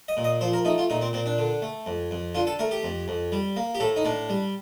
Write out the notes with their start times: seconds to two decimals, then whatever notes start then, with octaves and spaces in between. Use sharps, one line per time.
0.08 D#5
0.17 A#2
0.24 D#5
0.41 F3 C5
0.53 A#4
0.65 A3 D#4
0.78 F4
0.90 A#2 D#4
1.02 C4
1.13 A#2 C4
1.26 D4
1.38 D3
1.62 A3
1.86 F2
2.11 F2
2.35 D3 F4
2.47 A4
2.59 A3 A#4
2.71 G4
2.83 F2
3.08 F2
3.32 G3
3.56 A#3
3.75 G4
3.80 A2 A4
3.96 D#4
4.05 A2 D4
4.29 G3